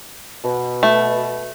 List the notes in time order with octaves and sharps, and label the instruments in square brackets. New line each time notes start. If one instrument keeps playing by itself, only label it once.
[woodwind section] B2
[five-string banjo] A3